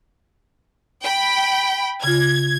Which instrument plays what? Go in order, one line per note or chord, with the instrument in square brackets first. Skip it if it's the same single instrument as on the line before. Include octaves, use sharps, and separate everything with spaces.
[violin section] G5 B5
[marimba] C#3 F4 [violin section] G#6